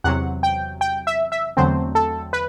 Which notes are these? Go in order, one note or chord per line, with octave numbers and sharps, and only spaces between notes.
E2 C3 F#3 F#5
G5
G5
E5
E5
E2 D3 F#3 A3 C4 C5
A4
B4